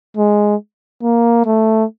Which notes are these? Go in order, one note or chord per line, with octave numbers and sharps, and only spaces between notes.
G#3
A#3
A3